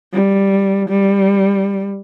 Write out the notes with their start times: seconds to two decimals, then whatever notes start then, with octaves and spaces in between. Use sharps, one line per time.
0.14 G3
0.89 G3